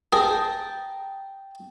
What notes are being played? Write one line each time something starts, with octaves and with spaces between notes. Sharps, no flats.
G#4 G5 A5 A#5